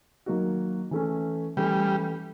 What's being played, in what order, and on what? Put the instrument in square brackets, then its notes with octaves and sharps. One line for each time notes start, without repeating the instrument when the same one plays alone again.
[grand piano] D#3 F#3 A#3 D#4 F#4
E3 A3 C#4
[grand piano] E3 A3 C#4 [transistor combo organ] G3